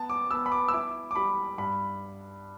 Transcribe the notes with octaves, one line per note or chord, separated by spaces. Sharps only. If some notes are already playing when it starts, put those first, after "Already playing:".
Already playing: B3 A5
D6
B3 E6
B5
D6
E6
E4 D6
D6
G3 B5
G2 B5